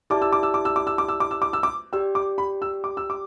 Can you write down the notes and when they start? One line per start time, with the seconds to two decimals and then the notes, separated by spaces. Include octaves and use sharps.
0.10 E4 G4 D5 A5 D6
0.22 E6
0.33 D6
0.43 E6
0.54 D6
0.65 E6
0.76 D6
0.87 E6
0.98 D6
1.08 E6
1.20 D6
1.31 E6
1.42 D6
1.53 E6
1.63 D6
1.93 G4 D5 G5 E6
2.15 D6
2.38 B5
2.62 E6
2.84 D6
2.97 E6
3.10 D6